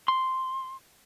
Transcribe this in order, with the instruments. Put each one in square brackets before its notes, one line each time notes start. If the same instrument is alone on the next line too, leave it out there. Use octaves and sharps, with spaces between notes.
[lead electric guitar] C6